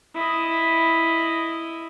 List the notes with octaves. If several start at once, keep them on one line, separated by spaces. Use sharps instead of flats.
E4 D#5